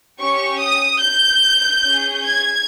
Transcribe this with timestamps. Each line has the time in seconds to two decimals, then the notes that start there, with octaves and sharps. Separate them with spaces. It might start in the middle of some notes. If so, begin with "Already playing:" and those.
0.20 C#4 G4 C#6
0.61 D#6
1.02 G6
1.84 C#4 G#4
2.25 G#6